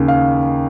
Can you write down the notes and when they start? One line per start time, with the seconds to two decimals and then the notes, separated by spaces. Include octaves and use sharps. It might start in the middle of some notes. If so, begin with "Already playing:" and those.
Already playing: D#2 C#3
0.08 F5